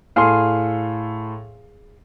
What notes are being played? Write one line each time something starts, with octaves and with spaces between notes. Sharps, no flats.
A2 G#4 A4 F5 C6